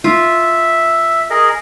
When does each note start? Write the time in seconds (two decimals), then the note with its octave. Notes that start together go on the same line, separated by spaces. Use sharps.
0.04 F4 E5
1.30 G#4 A#4 D#5